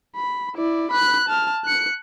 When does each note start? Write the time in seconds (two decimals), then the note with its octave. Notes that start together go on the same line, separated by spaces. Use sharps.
0.16 B5
0.56 E4 D5
0.91 B5 F#6
1.28 A5 F6
1.65 F#6 C#7